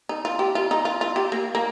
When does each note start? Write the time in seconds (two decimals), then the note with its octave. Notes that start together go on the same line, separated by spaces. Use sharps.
0.09 D#4
0.25 F4
0.39 G4
0.55 F4
0.71 D#4
0.85 F4
1.01 F4
1.16 G4
1.32 A#3
1.55 A#3